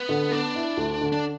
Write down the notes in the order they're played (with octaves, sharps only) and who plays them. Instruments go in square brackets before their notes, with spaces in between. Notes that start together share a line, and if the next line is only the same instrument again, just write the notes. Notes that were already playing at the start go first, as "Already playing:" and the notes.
Already playing: [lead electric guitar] B3
[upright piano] D3
[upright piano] B3 [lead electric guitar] D4
[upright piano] E4
D2
D3
[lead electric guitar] D4